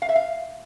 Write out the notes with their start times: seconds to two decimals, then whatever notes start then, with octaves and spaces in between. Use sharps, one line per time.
0.02 F5
0.09 E5
0.16 F5